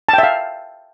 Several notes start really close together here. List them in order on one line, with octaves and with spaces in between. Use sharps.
A5 G5 E5 F5